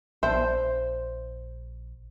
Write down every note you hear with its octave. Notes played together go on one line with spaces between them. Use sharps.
A#1 B3 D4 C5 E5